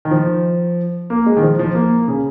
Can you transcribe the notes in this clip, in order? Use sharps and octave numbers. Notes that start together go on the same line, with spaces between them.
D#3
F3
A#3
G#3
D#3
F3
F3
A#3
C#3